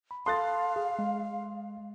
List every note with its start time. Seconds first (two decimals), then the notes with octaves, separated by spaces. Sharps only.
0.11 B5
0.26 A4 F5 A5 C6 D#6 F#6 A6
0.76 G#4
0.99 G#3